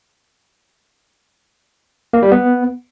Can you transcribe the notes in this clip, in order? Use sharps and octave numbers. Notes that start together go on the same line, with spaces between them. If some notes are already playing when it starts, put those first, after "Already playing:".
A#3
G3
B3